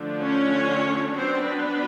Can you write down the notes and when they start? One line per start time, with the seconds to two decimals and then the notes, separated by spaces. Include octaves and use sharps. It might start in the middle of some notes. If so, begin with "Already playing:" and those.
Already playing: D3 F3 A3 D4
0.22 C#4 C#5
1.14 F#3 B3 C4 D4 C5
1.45 B3 B4